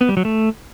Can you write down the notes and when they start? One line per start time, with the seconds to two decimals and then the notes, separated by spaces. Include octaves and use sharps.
0.01 B3
0.09 G3
0.17 F#3
0.25 A3